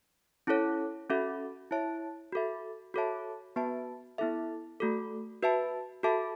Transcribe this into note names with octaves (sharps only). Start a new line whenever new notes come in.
C#4 E4 A4 C#5
C#4 F#4 A4 E5
E4 C#5 E5 A5
F#4 A4 E5
F#4 A4 C#5 E5 A5
B3 F#4 B4 E5 A5
B3 E4 A4 E5
A3 F#4 A4
F#4 B4 E5 A5
F#4 A4 E5 A5